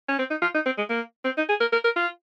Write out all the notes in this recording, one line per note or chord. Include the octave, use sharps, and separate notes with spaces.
C#4
C4
D#4
F4
D#4
C4
G#3
A#3
C4
D#4
G#4
A#4
A#4
A#4
F4